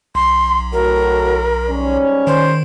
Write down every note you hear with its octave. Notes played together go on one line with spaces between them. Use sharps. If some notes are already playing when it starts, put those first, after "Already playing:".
B1 C6
A2 F#4 A#4
G#2 G3 C#4
D#3 C5